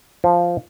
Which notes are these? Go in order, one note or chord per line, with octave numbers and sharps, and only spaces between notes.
F3